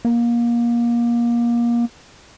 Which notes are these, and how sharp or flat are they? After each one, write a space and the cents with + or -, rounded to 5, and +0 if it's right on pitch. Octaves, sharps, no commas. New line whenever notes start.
A#3 +25